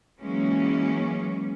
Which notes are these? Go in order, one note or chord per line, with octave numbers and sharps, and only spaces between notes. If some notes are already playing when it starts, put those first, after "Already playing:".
E3 F#3 G#3 A#3 C#4